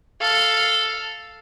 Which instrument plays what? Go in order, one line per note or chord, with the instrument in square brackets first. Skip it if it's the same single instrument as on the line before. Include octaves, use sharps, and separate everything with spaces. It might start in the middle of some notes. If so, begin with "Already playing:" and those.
[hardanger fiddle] A4 F5